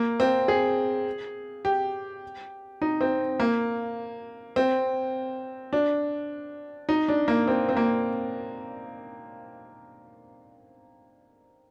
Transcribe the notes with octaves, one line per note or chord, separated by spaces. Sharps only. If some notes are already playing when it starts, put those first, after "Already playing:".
Already playing: A#3
C4
G#4
G4
D#4
C4
A#3
C4
D4
D#4
D4
A#3
C4
C4
A#3